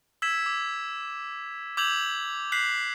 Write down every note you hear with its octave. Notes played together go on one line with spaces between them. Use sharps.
E6 G#6 B6 E7
D6
D6 E6 G6 G#6 F7 F#7
F#6 G6 B6 C7 F#7